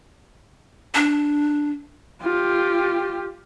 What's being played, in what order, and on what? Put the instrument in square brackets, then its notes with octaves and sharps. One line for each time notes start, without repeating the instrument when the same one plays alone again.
[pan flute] D4
[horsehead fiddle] F4 G4